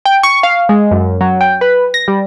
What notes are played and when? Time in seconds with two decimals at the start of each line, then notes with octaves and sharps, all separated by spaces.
0.05 G5
0.23 C#6
0.43 F5
0.69 G#3
0.91 F#2
1.21 F#3
1.41 G5
1.61 B4
1.94 A#6
2.08 G3